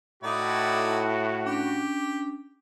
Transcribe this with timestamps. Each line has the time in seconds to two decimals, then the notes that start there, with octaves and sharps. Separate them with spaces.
0.23 A2 D#4 E4 F#4 D5
1.45 C#4 D4 G4 D6